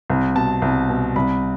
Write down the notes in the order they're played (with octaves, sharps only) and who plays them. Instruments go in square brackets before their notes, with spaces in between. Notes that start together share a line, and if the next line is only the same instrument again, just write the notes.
[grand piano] C2
B2 A5
C2
B2
C2 B5